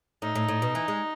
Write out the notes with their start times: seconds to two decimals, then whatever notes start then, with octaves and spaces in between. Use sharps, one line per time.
0.22 A2 D#4
0.35 A2
0.48 A2
0.62 B2
0.75 E3
0.88 G#3